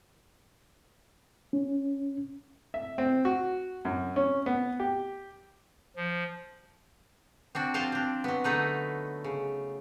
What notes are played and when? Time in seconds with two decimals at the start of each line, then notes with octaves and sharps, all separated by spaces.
1.53 C#4
2.74 E5
2.98 C4
3.25 F#4
3.85 F#2
4.16 C#4
4.46 B3
4.80 G4
5.96 F3
7.55 C4 D4 F#4
7.74 F3 C4 F4 C5 F5 A5
7.92 C4 D4
8.24 F#3 B3
8.44 D3 A3 D#4 B4
9.24 C#3